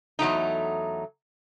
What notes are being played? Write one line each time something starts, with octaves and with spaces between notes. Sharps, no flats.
E2 F#3 A3 D#4